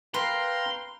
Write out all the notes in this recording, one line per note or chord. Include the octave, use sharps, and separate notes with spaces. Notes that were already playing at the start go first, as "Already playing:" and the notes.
B4 F5 G5 A#5 C6